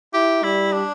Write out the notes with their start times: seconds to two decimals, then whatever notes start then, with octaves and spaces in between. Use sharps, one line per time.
0.14 E4 G4
0.43 G3 E4
0.72 D4